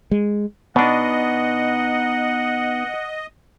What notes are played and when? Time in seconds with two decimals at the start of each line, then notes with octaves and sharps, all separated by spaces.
0.11 G#3
0.76 B2 B3 D4 D#4 D#5 F#5